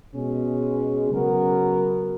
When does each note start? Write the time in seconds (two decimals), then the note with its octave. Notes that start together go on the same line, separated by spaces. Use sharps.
0.14 B2 G#3 C#4 G#4
1.11 C#3 F#3 B3 F#4 A#4